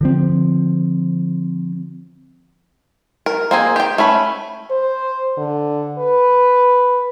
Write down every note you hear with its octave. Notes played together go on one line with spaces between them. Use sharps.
D3 F3 C4
A#4
A#3 C4 G#4
G4 G5
A3 C#4 B5
C5
D3
B4